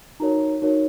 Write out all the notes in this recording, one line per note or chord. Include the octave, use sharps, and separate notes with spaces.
D#4 F#4 A#4 C#5 A#5
D#4 F#4 A#4 C#5